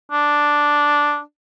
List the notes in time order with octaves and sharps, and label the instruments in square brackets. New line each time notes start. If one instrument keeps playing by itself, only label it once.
[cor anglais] D4